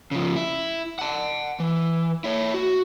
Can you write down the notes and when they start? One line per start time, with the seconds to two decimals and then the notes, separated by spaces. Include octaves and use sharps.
0.11 C#3 F3
0.36 E4
0.99 F#5 A5
1.60 E3
2.24 E4 C#5
2.54 F#4